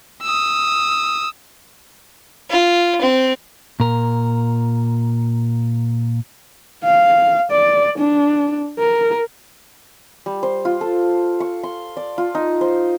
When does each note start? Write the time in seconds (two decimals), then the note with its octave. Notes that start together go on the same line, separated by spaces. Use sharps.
0.22 D#6 E6
2.50 F4
3.01 C4
3.80 A#2 A#4
6.84 F5
7.51 D5
7.98 D4
8.79 A#4
10.26 G3
10.43 C5
10.65 F4
10.81 A4
11.40 C#6
11.63 C6
11.97 D5
12.18 F4
12.35 D#4
12.61 C5